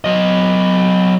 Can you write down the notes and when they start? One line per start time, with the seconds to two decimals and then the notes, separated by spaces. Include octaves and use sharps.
0.05 F#3 D#5